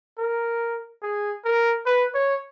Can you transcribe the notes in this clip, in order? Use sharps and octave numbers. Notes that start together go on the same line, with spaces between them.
A#4
G#4
A#4
B4
C#5